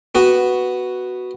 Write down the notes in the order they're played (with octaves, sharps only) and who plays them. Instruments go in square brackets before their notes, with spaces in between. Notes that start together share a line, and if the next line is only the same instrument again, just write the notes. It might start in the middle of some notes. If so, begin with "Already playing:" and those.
[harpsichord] B3 F#4